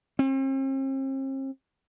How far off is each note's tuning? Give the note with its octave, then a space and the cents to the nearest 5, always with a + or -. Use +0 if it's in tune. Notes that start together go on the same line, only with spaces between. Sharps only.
C4 +45